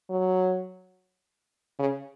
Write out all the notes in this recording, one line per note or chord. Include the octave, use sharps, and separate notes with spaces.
F#3
C#3